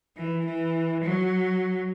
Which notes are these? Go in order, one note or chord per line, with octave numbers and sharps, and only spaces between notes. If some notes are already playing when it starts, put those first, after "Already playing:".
E3
E3
F#3